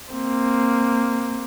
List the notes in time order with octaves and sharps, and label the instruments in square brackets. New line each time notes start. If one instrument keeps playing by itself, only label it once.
[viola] A#3 C4